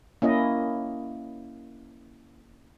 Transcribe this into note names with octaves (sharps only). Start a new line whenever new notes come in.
A#3 C#4 E4 D#5